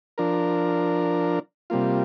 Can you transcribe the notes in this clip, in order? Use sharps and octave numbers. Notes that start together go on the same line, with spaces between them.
F3 D4 A#4
C3 G3 A#3 F4